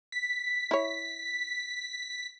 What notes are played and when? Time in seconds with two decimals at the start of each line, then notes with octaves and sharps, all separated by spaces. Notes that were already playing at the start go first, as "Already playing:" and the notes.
0.12 B6
0.71 E4 C#5